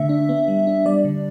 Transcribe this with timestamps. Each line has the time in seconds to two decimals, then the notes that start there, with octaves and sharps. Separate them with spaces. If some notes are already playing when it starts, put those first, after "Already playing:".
Already playing: D3 A3 E5
0.09 D4
0.29 B3
0.48 G3
0.67 D4
0.86 G3 D5
1.05 D3